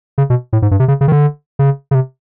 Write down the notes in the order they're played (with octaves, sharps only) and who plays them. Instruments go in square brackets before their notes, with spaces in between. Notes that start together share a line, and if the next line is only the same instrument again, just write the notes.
[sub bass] C#3
B2
A2
G#2
G2
C3
C#3
C#3
D#3
D3
C#3
C#3
C3